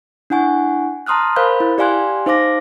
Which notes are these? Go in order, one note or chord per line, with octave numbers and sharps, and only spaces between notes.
D4 E4 F#5 G#5 C#6
A5 A#5 C6 D#6 F6 F#6
A#4 C5 F5 B5 F#6 G6
E4
G4 D5 F5 G#5 C6 F#6
D#4 C5 F5 D6 A#6